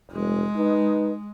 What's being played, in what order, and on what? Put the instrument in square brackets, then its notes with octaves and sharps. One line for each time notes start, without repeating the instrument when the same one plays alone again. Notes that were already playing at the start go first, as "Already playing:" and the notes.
[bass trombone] F1 [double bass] G#3
[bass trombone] D#4 [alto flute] B4